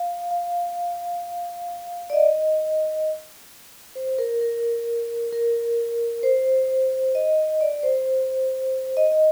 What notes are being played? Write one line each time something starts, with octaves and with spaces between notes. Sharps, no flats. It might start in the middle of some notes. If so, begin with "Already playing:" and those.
Already playing: F5
F5
D5
D#5
C5
A#4
A#4
A#4
C5
D#5
D5
C5
D#5
D#5